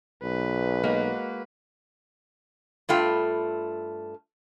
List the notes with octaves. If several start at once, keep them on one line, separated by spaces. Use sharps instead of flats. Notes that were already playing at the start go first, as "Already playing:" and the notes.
B1 B4
G#3 A#3 F#4
G2 A3 F4 G5